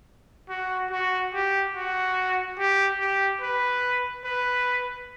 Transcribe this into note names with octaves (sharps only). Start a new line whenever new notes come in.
F#4
F#4
G4
F#4
G4
G4
B4
B4